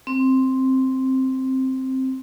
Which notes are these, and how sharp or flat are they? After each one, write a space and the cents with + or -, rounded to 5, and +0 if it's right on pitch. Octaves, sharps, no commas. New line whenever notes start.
C4 +5